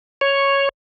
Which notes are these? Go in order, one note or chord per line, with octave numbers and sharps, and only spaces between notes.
C#5